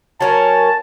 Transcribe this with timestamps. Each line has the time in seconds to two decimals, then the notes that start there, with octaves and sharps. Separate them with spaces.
0.21 F#3 C#4 A#4 A5